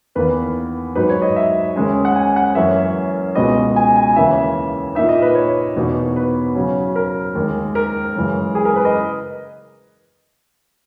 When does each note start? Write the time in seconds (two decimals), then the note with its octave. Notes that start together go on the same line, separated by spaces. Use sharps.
0.15 E2 D#3 A#3 B4
0.95 G#2 F#3 A#3 D#4 B4
1.09 C#5
1.22 D#5
1.36 E5
1.76 D#2 C#3 G#3 C#4
2.05 F#5
2.15 G#5
2.36 F#5
2.55 F#2 E3 A#3 C#4 E5
3.35 C#2 B2 G#3 B3 D#5
3.76 G#5
3.96 G#5
4.16 D#2 C#3 E3 A#3 E5
4.95 A#2 A#3 D#4 E5
5.09 D#5
5.22 B4
5.35 C#5
5.75 E2 B2 A#3 D#4
6.16 B4
6.55 C#3 F#3 C#4
6.96 A#4
7.35 D#2 D#3 G#3
7.75 A#4
8.15 F#2 C#3 E3 G#3
8.55 G#4
8.65 A#4
8.76 B4
8.85 D#5